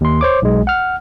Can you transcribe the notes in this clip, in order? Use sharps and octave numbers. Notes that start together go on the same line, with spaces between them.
D#2 C6
C5 C#5 D6
B1 G#3
F#5 F6